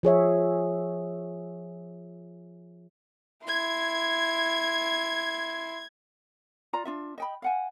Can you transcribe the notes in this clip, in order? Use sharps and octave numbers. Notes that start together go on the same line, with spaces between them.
F3 G#4 C#5 E5
E4 C6 G#6
F4 D5 A#5
D4 F4 E5
D#5 G5 B5
F5 F#5 G#5